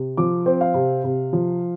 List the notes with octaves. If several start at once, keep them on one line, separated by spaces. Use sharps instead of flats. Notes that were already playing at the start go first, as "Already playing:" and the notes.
Already playing: C3
F3 D6
C4
F5
C3
C3
F3